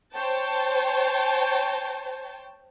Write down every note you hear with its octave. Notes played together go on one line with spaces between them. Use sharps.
C5 C#5 G5 A5